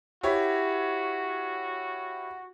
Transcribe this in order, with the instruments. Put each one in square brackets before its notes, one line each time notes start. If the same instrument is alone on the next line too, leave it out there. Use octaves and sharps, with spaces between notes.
[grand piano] E4 G4 C#5 [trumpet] F#4